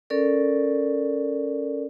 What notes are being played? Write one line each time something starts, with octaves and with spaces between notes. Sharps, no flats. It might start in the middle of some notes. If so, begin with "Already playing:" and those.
C#4 A4 A#4 D5